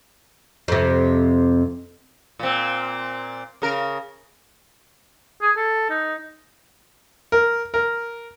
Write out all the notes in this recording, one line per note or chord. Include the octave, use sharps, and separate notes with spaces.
F2 C3
A#2 C4
C#3 A#4
G#4
A4
D#4
A#4
A#4